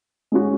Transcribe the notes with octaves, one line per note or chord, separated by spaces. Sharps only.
G#3 C#4 F#4